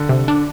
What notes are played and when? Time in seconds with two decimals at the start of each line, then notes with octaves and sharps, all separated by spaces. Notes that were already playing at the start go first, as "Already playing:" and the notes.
Already playing: D3
0.09 C3
0.28 D4